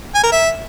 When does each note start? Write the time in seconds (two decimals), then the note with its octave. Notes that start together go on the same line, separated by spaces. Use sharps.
0.14 G#5
0.23 A#4
0.32 E5